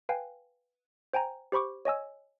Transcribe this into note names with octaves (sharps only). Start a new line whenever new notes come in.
B4 F5 G5 G#5
C5 G5 G#5 A#5
G4 C5 B5 C#6 D6
C#5 D#5 G#5 E6